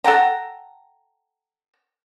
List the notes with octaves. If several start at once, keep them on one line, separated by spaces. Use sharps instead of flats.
A4 F#5 G5 A#5